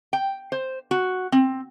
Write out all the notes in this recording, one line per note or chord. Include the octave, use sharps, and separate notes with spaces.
G5
C5
F#4
C4